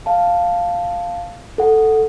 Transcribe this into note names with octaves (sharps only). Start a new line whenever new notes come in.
F5 A5
A4 F#5